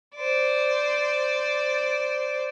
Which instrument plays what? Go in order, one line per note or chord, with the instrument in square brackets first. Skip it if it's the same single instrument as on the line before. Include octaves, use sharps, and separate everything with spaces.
[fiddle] C5 D5